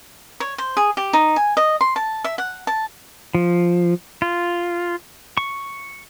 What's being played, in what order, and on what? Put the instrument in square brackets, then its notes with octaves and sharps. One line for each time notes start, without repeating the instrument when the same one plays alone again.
[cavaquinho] C#5
C5
G#4
G4
D#4
G#5
D#5
C6
A5
E5
F#5
A5
[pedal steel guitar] F3
F4
C#6